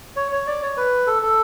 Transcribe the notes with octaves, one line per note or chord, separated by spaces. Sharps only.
C#5
C#5
D5
C#5
B4
A4
A4